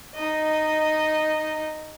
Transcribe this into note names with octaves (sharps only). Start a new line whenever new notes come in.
D#4 D#5